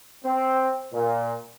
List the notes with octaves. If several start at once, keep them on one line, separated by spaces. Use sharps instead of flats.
C4
A#2